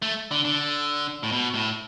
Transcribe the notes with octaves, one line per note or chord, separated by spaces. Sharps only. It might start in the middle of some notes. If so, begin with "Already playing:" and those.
A3
D3
D3
A2
B2
A2